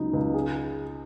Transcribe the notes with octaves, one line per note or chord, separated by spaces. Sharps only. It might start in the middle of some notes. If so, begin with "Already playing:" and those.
Already playing: C#2 C#3 F#3 D#4
C#2
G#4